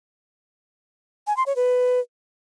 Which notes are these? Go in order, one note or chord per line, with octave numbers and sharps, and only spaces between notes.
G#5
C6
C#5
B4